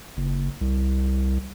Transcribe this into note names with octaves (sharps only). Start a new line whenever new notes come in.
F#1
C2